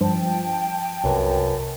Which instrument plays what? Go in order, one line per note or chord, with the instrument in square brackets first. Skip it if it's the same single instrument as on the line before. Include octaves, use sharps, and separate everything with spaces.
[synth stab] G2 F3 [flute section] G5 A5
[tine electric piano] C2 C3 B4 [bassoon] F#2